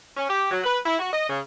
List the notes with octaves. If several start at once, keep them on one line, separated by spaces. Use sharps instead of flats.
C#4
G4
F#3
B4
E4
F#4
D#5
C#3